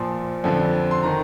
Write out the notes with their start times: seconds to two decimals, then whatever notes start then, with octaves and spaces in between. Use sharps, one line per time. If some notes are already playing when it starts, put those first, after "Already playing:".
Already playing: A#2 F3 C6
0.44 F2 D3 F3
0.91 C6
1.03 D#3 A#5